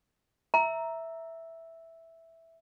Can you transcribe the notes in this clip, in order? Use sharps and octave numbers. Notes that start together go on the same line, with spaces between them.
E5 A#5